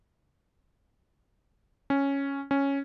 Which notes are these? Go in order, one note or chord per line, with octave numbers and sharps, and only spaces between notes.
C#4
C#4